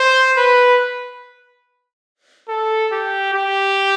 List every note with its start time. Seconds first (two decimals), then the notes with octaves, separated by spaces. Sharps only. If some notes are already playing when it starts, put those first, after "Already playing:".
Already playing: C5
0.37 B4
2.48 A4
2.91 G4
3.34 G4